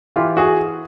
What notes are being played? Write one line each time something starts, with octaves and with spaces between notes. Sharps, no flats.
E3 F4 G4
F#4 G#4